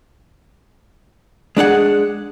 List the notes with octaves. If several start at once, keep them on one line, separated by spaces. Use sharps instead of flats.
G#3 D4 G#4 F#5